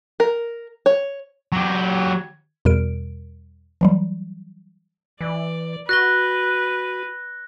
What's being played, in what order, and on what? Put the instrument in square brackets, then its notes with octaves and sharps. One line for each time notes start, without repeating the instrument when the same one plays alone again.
[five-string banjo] A#4
C#5
[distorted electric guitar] F#3 G4
[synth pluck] E2 B2 G3 A#4 D7
E3 F#3 G3
[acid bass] E3 [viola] D5
[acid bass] F#4 [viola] B4 [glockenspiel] F#6 A#6 G7